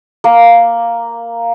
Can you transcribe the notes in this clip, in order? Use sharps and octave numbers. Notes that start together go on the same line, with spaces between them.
A#3